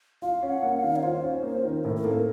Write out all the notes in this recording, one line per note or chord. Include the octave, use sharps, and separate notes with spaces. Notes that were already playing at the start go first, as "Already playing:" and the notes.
F4 F5
C#4
F#5
A#3
F5
D#3
C#5
F4 C5
C#4
A#3
D#3
A2 A#4
A#4
A#3 A4